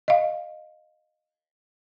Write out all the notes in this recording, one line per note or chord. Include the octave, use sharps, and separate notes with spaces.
D#5 F5